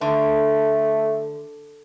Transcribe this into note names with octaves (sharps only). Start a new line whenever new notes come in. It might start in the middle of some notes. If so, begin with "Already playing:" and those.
D3 A3